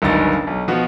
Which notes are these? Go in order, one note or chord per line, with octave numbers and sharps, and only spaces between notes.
G1 C#2 F#2 D#3 A6
B1
B2 F3 B3 F#4